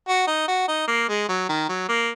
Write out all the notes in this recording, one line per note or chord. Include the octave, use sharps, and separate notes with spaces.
F#4
D#4
F#4
D#4
A#3
G#3
F#3
D#3
F#3
A#3